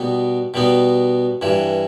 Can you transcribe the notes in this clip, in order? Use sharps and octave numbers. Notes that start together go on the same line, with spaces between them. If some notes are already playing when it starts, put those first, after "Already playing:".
Already playing: B2 G3 B3 D#4
B2 G3 B3 D#4
G2 E3 G3